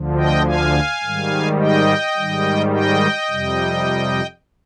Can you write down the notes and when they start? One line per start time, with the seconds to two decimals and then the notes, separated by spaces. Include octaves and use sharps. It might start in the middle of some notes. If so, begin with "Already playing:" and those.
Already playing: D2 D3 F3
0.17 D#5 G5
0.46 F5 G#5
1.03 G#2 D#3 G3
1.59 D#5 G5
2.16 G#2 D#3 G3
2.73 D#5 G5
3.30 F2 C3 G3